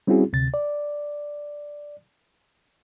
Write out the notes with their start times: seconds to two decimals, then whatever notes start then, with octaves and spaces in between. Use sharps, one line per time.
0.07 G3 C4 C#4 E4 F#4 G#4
0.33 D2 C3 A6
0.54 D5